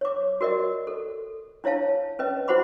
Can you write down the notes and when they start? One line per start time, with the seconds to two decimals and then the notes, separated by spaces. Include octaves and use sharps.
0.01 C#5 D6
0.41 F#4 A#4 D5 D#5
0.87 A4
1.64 D4 E4 C#5 F5 A5
2.19 C#4 B4 D#5
2.48 E4 F#4 C5 F#5 B5 D6